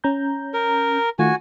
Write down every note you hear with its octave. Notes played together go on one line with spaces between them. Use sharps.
C#4 A#5 G6
A#4
D#3 A3 F4 F#4 G#5